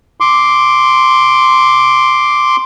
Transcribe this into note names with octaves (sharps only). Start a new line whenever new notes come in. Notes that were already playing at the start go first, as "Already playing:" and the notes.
C6 D6